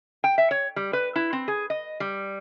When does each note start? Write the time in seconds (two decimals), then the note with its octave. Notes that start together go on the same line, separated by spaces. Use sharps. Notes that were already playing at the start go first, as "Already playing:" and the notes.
0.24 G5
0.38 E5
0.51 C#5
0.76 G3
0.93 B4
1.16 E4
1.33 C4
1.48 G#4
1.70 D#5
2.00 G3